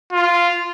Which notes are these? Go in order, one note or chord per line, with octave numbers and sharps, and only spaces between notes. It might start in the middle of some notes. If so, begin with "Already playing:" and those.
F4